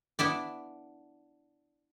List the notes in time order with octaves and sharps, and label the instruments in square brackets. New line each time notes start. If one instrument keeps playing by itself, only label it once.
[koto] B3 D4 E4 D5